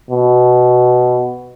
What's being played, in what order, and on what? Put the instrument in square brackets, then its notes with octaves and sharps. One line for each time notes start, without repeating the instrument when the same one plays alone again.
[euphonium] B2